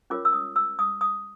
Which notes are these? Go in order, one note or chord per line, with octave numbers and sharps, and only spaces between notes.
C#4 F4 A#4 C#5 D6
E6
D#6
E6
D#6
D#6